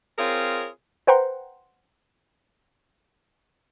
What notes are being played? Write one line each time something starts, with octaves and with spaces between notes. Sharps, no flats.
C4 F4 G#4 A#4 C#5
B4 C5 F#5 G5 A#5 C6